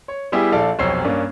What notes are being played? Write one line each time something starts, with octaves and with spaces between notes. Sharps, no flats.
C#5
G3 B3 E4 G4 G#4
A#1 A4 D5 F5 A5
F1 B1 C5 C#5 E6 C7
G2 A#3 C#4 D4